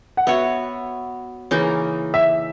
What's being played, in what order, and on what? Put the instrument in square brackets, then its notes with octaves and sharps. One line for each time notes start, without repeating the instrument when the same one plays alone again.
[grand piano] F#5
[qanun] B3 F#4 C#5 [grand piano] E5
[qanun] C#3 E3 A#3 D#4
[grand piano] E5